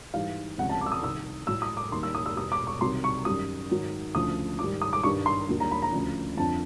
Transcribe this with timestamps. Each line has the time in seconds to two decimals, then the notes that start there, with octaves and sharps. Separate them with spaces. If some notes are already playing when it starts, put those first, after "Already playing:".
0.13 G#2 E3 G3 F5
0.58 C#2 C3 F3 F#5
0.69 A5
0.81 D6
0.86 E6
0.92 D#6
1.03 C2 C3 D#3 E6
1.47 A2 F#3 E6
1.62 D#6
1.77 D6
1.92 D#2 D#3 G3 C6
2.03 E6
2.15 D#6
2.26 E6
2.36 E2 B2 G3 D#6
2.52 D6
2.67 C#6
2.81 C2 C3 D#3 F#3 C6
3.04 C#6
3.25 F#2 D#3 G3 D#6
3.71 G#2 D#3 F#3
4.15 D2 C#3 F3 D#6
4.59 G#2 D#3 G3 D6
4.81 D#6
4.93 D6
5.03 G2 D#3 G3 C#6
5.26 C6
5.48 D#2 D3 F#3
5.60 A#5
5.71 B5
5.82 A#5
5.92 D2 C#3 F3
6.37 F2 D3 F3 A5